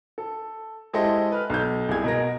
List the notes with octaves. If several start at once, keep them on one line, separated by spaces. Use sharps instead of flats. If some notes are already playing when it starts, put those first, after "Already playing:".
A4
G#3 E4 G4 A4 C5 D#5
B4 F6
B1 G6
C2 G#4 G#6
B2 A#4 A#6